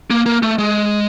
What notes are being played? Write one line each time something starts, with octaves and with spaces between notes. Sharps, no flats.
A#3
A#3
A3
G#3